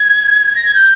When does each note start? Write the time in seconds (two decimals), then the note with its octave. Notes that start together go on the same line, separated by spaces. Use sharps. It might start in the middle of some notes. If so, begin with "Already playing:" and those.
Already playing: G#6
0.55 A#6
0.65 G#6
0.74 G6